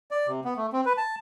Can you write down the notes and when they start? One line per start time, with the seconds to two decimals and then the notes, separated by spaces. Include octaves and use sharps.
0.11 D5
0.28 C3
0.45 B3
0.56 A3
0.73 C4
0.85 B4
0.97 A5